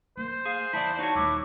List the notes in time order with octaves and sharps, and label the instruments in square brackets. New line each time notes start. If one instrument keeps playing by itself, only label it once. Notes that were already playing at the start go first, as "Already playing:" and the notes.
[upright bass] A#3 [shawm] C5
[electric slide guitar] G#4 [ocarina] F5
[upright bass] E2 [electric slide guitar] E4 D5 [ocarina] A5
[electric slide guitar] D#4 C#5 [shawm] F#4
[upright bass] D#1 D#2 [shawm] E4 [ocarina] D6